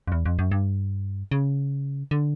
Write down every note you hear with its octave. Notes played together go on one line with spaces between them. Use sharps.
F2
E2
F2
F#2
G2
C#3
D3